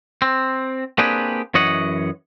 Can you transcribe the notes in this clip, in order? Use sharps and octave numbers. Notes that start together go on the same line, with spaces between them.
C4
A#3 C4 D4 G4 G#4 B4
F#2 E3 C#5 D#5 F#5